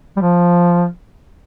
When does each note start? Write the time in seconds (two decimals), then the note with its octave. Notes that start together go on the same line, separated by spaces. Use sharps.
0.16 G3
0.21 F3